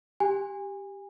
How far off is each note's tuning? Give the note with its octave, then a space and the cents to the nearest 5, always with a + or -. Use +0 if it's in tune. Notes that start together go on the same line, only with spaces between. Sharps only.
G4 +0 G#5 -30